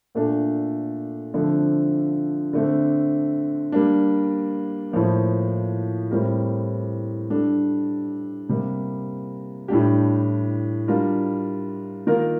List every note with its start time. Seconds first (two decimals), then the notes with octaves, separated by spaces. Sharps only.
0.15 A#2 A3 D4 A4
1.34 D3 F3 A3 C4
2.53 D3 A3 C4
3.72 G3 A#3 D4
4.92 A2 F3 A#3
6.11 A2 G3 C4 G4 A#4
7.30 G3 D4 A4
8.49 C3 G3 A#3
9.68 A2 G3 D4 G4
10.88 G3 D4 F4 A#4
12.07 D#3 A#3 F4 A#4